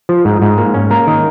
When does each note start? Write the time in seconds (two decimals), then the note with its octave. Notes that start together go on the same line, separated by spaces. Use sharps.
0.09 F3
0.25 G#2
0.42 G#2
0.58 A#3
0.74 C#4
0.90 A#3 A#4
1.07 D#3